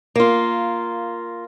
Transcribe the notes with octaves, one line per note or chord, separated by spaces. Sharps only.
A#3 F4